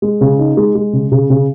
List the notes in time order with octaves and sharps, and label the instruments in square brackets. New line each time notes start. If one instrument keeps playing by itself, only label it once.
[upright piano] G#3
C#3
D#4
G#3
G#3
C#3
C#3
C#3